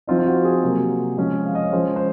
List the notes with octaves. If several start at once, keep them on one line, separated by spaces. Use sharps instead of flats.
F3 C4 D#4 F4
F4
F#4
G#4
C3 F#3 A#3
F3 G#3 C#4
F5
D#5
C#5
F3 G#3 C#4 C5
C5